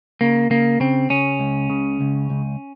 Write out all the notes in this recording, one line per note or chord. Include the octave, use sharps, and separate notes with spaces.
C#3 A#3
C#3 A#3
C#3 C4
C#3 C#4
C#2
C#3
C#2
C#2